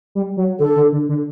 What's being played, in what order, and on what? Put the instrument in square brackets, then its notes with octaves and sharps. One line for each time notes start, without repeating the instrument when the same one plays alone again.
[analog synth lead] G3
F#3
[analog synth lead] D3 [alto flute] A4
[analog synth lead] D3
D3
D3